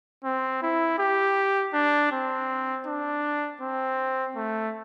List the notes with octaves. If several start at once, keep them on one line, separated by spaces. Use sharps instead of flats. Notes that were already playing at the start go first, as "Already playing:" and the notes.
C4
E4
G4
D4
C4
D4
C4
A3